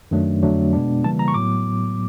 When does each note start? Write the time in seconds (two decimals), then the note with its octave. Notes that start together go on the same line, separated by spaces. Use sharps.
0.11 F#2 D#3 F#3 A3 D4
0.43 F2 D3 F#3 A3 D4
0.73 B2 G#3 B3 D4
1.04 C#3 E3 G3 A#3 A5
1.19 A#5
1.28 C#6
1.34 A2 F#3 B3 D6